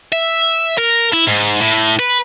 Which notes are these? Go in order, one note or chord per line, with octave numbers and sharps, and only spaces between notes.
E5
A#4
E4
G#2
A2
B4